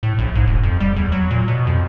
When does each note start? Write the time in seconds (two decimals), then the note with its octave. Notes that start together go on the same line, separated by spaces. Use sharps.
0.03 A2
0.19 A#1
0.35 G#2
0.47 D#1
0.63 F2
0.80 G3
0.96 E2
1.12 F#3
1.30 A#2
1.48 B2
1.67 F2